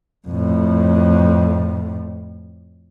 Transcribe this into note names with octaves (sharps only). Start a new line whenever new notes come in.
F2 A2